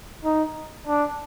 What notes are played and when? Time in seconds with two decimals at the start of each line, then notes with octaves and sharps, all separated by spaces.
0.25 D#4
0.87 D4